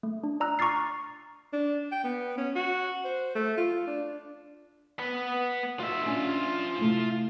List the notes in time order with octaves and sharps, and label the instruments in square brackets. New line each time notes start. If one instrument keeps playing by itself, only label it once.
[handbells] A3
D4
D5 A#5 E6 F#6
A#5 C#6 D6 F6 A6 C7
[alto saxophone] D4
G5
B3
C#4
F#4
C5
A3
F4
D4
[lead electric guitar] B3 B4
[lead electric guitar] F4 E5 [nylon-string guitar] F#4 D#5
[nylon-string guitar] C#4 D4
C3 A3 E4